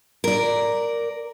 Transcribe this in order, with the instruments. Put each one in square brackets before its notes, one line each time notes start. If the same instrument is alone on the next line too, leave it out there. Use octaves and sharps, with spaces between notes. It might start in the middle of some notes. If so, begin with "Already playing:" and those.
[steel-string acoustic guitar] A#4 D5